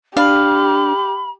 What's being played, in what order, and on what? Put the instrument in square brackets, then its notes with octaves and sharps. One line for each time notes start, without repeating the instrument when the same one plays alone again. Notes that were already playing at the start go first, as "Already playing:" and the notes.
[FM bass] D4 [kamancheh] G4 [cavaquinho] F5 [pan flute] B5